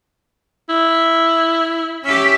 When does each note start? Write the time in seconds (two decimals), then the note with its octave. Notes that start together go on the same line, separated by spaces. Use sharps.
0.69 E4
2.04 C#4 G4 E5